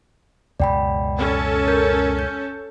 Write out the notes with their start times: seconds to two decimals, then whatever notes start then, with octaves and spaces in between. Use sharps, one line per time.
0.60 C#2 F#2 B2 D5 G5 B5
1.17 C#4 A4
1.68 A#4 G6
2.19 G6